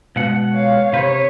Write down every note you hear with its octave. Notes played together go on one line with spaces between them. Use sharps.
B2 G#3 F#5
C#5 F5
C3 B4 C#5